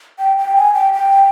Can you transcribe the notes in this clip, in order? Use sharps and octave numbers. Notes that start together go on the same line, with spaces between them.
G5
G5
G#5
G5
G5